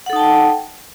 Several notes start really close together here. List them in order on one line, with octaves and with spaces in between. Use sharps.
F#5 A4 D#4 A5 G5